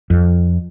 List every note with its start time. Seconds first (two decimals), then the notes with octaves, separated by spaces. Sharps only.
0.10 F2